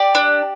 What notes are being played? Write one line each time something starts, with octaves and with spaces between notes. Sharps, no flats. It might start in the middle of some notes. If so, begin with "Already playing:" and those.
Already playing: G4 D5
D4